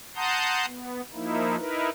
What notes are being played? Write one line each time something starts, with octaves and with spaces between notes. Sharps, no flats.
F#5 A5 A#5 C6 D#6 G6
B3
F3 A#3 D#4 E4
D#4 E4 A#4 B4